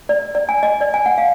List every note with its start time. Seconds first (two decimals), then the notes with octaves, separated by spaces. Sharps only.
0.09 D5
0.35 D5
0.49 G#5
0.63 D#5
0.81 D5
0.94 G#5
1.06 F#5
1.18 F5